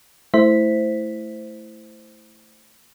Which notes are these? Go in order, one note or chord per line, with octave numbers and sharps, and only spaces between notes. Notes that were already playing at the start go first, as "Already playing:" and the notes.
A3 E4 C5 E5 B6